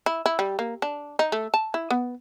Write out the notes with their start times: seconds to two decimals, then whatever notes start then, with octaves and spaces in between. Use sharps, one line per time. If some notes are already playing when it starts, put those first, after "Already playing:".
0.06 E4
0.26 E4
0.39 G3
0.59 A#3
0.82 D4
1.19 D#4
1.32 A3
1.54 A5
1.74 E4
1.91 B3